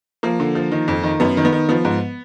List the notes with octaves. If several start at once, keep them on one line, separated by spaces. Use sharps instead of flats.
F3 A#3
D3
F3
D#3
F2
D#3
F#2 B3
D#3
B3
D#3
F3 B3
G#2